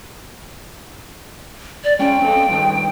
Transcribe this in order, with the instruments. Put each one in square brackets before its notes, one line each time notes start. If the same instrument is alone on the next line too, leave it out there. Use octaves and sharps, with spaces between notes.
[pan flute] D5
[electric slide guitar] G#3 C#4 G#4 [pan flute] G5
[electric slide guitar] C4 A4
G2 D#3 A5